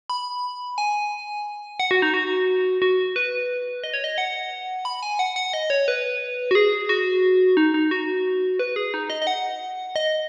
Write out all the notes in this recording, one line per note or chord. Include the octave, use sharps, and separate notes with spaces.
B5
G#5
F#5
F#4
D#4
F#4
F#4
B4
D#5
C#5
D#5
F#5
B5
G#5
F#5
F#5
D#5
C#5
B4
F#4
G#4
F#4
D#4
D#4
F#4
B4
G#4
D#4
D#5
D#5
F#5
D#5